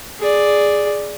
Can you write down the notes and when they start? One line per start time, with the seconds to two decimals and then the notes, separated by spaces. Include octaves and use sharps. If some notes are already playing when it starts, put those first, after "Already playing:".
0.19 G#4 D5